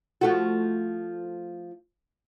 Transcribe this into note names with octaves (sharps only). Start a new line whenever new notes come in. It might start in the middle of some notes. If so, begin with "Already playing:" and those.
F3 A3 F#4